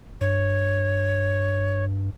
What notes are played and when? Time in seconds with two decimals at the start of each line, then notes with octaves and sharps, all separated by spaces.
0.21 G2 C#5